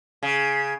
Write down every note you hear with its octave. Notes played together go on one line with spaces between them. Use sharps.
C#3